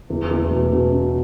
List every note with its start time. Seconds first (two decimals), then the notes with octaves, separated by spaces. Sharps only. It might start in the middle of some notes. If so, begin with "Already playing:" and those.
0.10 E2
0.31 E2
0.51 B2
0.72 B2
0.92 C#4